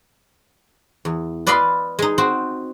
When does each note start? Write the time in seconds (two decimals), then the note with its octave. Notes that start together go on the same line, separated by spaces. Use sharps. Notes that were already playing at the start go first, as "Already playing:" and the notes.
1.05 E2
1.47 B4 D5 D#5 F5 B5 C6
1.99 G#3 D#4
2.18 C4 F#4 C5